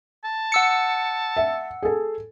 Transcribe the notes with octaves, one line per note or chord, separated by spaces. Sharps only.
A5
F#5 E6 C#7
E5
G#4 A4